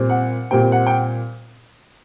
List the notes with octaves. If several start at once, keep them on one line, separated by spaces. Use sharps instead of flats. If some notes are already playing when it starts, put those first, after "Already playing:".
Already playing: A#2 G3 C4
F#5
A#2 G3 C4 G5
F#5
G5